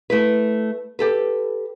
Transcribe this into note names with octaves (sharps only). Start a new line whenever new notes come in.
A3 E4 B4
G4 A4 B4